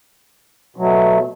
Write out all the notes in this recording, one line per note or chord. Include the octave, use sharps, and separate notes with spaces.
B2 F#3 A3